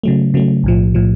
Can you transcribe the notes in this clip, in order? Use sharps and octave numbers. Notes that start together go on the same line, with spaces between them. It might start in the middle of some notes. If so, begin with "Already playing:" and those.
C#3 F#3 A3
C#3 F#3 A3
B1 A2 F3
A2 F3